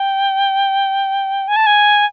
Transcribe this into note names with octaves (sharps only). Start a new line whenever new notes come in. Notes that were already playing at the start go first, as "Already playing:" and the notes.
Already playing: G5
G#5
A5
G#5